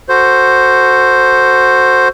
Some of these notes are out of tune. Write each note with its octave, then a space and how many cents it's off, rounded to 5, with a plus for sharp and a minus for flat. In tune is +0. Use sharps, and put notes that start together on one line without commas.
F#4 +0 A4 +25 C5 +0